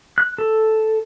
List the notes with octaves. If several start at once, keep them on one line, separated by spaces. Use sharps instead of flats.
F#6
A4